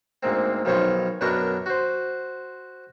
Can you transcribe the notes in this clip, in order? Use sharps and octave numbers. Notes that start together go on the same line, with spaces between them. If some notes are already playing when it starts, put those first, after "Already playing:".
D2 G#2 A#3 C4
B1 D#3 F3 C5 C#5
F#2 B2 D4 A#4 G5 C#6
F#4 C5